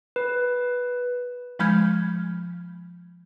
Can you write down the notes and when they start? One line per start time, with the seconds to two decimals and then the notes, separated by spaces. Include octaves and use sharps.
0.16 B4
1.59 F3 G#3 B5 F6 G6 G#6